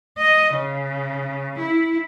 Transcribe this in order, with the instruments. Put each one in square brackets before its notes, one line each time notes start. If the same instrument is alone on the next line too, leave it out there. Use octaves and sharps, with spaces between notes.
[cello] D#5
C#3
E4